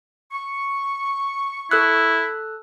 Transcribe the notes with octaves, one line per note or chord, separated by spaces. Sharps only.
C#6
E4 A4 E6 F#6